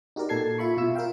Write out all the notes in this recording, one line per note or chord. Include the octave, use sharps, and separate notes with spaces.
D#4 F#4 G4 A#4 D5
A#2 A4 A5 G#6 C7
F4 E5 B5 C#6
B2 F4 E6
F4 A#4 E5 F5 G5